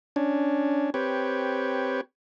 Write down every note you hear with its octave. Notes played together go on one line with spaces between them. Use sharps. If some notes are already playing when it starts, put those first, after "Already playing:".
C#4 D4
C4 G4 B4 C#5